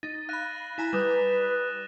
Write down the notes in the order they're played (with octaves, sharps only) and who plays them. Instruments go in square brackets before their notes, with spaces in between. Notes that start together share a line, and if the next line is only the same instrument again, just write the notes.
[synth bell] D#4 [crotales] A6
[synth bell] F5 B5 [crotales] F#6 A#6 D#7
[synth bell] E4 G#5 A#5
[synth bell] G3 [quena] B4 [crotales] D#6 F#6 E7